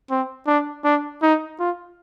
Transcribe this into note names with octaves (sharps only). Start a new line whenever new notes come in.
C4
D4
D4
D#4
F4